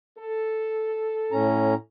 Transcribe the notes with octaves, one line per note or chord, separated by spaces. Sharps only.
A4
A2 C#4 A#5